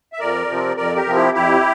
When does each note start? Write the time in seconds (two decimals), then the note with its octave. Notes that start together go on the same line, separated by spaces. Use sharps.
0.13 E5
0.20 F2 A#4 D5
0.48 C3 F3 C4
0.77 F2 A#4 D5
0.96 G4 A#4
1.06 C3 F3 C4
1.15 E4 G4
1.34 F2 E4 G4